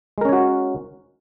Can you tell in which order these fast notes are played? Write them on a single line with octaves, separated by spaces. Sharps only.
G#3 A#4 C#4 C#5 F#4